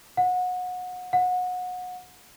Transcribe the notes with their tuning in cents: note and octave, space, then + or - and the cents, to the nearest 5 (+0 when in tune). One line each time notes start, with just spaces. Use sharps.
F#5 -25
F#5 -25